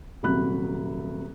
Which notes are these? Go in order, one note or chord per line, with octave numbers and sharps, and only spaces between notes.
D#1 C2 F#3 B5 F#6